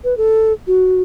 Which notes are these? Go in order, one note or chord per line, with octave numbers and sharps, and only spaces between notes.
B4
A4
F#4